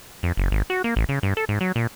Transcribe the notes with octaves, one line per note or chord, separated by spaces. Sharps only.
F2
F#1
G#1
F#4
A#3
A1
C#3
G2
A4
G#2
F#3
A#2